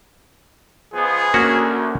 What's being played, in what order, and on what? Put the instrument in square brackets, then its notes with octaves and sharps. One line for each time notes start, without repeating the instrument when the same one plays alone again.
[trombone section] C#2 F3 B3 [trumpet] G#4
[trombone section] D2 [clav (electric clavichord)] A#3 C#4 F#4